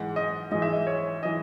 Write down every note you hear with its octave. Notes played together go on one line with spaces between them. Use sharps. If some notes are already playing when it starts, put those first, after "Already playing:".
Already playing: G#2 E3 F#5
D#5
G#2 E3 D#5
E5
D#5
C#5
E3 D#5